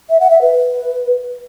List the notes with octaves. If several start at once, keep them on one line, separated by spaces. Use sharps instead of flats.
E5
F#5
E5
B4